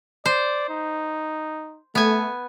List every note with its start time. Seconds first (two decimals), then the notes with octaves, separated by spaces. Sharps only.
0.26 C5 D5
0.69 D#4
1.95 A3 B3 G#5